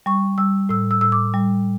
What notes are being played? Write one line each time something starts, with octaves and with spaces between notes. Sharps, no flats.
G3 C#6
G3 E6
A2 E6
E6
A2 E6
D6
G3